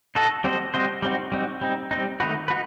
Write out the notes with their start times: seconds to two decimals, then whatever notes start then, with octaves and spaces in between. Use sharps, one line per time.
0.15 D#4 F#4 A4 D#5
0.44 G3 C4 F#4 C5 D#5
0.74 G3 C4 F#4 C5 D#5
1.02 G3 C4 D#4 F#4
1.32 G3 C4 D#4 F#4
1.61 G3 C4 D#4
1.91 G3 C4 D#4
2.20 D#3 A3 D#4 F#4 B4
2.48 D#4 F#4 B4